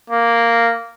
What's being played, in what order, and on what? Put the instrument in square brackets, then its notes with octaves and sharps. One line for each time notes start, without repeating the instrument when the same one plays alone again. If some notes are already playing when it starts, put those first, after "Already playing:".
[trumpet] A#3